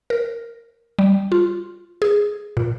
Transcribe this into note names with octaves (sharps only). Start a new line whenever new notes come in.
A#4
G3
F4
G#4
A#2